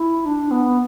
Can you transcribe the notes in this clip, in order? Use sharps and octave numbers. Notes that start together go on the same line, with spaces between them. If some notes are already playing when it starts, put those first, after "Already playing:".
Already playing: E4
D4
B3